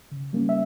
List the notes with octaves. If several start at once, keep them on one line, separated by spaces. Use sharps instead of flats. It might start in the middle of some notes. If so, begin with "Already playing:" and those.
C#3
G3 A#3 C#4
E5